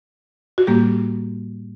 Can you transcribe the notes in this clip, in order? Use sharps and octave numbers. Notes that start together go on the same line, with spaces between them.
F#4
A2 G3 A#3 G4